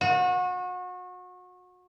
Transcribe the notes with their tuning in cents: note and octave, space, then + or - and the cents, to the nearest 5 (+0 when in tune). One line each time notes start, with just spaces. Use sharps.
F#4 -30